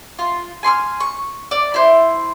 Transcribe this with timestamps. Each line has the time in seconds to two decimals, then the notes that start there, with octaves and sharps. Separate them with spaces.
0.19 F4
0.63 G#5 C6 C#6 F6
1.00 C#6
1.51 D5
1.74 E4 C5